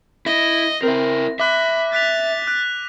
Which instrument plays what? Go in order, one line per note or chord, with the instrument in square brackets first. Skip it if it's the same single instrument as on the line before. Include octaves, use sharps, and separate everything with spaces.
[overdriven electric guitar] E4 [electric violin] D#5 [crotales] A#6
[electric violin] C4 [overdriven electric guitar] E4 A#4
[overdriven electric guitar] E5 [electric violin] B5 [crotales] D6 F#6
[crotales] F#6 B6 F7 [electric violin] A6
[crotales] F#6